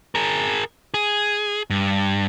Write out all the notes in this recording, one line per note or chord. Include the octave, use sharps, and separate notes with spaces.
G#4 A#4
G#4
G2